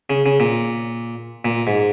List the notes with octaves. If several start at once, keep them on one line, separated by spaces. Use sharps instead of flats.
C#3
C#3
A#2
A#2
G#2